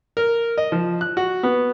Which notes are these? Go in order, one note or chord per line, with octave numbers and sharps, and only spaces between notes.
A#4
D#5
F3
F#6
F#4
B3